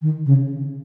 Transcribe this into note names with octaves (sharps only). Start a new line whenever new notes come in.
D#3
C#3